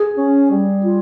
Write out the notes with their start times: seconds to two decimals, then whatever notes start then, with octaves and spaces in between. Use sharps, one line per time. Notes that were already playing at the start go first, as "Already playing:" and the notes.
Already playing: G#4
0.17 C#4
0.50 G3
0.84 F4